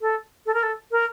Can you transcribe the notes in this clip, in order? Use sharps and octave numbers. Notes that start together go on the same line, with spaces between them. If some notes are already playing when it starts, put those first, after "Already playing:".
A4
A4
A#4
A4
A#4